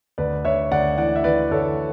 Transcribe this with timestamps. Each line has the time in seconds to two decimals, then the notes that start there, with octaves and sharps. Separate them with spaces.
0.18 D2 B4 D5
0.45 D2 C#5 E5
0.71 D2 D5 F#5
0.98 E3 D5 F#5
1.16 E5
1.24 E3 B4 D5
1.51 D2 A4 C#5